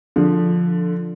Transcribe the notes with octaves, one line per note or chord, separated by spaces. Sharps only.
D3 F3